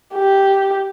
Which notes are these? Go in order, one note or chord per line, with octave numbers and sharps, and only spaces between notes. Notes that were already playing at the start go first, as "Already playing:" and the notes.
G4